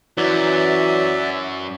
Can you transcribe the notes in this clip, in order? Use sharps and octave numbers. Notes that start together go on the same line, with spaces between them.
F#2 E3 F#3 D5 E5